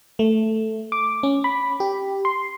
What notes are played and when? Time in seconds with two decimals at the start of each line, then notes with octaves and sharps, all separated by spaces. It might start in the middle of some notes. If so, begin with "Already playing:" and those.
0.19 A3
0.92 D6
1.23 C#4
1.44 B5
1.80 G4
2.25 C6